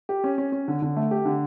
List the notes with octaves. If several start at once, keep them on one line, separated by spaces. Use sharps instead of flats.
G4
C#4
C#4
C#4
D3
D3
A3
G4
D3